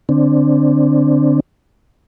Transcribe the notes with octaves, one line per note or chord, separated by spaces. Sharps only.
D3 C4 D4